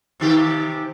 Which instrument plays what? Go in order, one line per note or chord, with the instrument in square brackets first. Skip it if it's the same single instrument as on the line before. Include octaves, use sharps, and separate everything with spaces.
[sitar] C3 D#3 G4